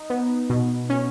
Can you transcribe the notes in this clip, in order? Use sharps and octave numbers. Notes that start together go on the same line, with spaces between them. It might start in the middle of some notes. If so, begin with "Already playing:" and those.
Already playing: D#4
B3
B2
C#4